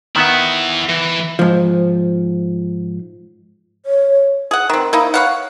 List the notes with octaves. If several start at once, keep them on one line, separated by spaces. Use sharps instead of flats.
D#3 B3 E4 E5 F#5
E3
G#2 F3
C#5
G#4 F#5
D#3 C4
A#3 D#4 E4
C#5 F5 F#5